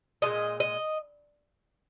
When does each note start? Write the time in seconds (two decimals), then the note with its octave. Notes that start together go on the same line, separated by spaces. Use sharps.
0.22 A#2 F3 G#3 D#5
0.60 D#5